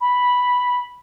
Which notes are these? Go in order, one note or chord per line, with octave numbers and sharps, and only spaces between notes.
B5